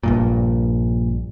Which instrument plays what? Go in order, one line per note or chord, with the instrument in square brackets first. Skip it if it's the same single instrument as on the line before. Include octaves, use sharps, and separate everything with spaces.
[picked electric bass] A#1 G2 A#2